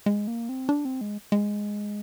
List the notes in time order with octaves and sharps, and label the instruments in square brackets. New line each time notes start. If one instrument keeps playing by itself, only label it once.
[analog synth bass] G#3
A#3
C4
D4
C4
G#3
G#3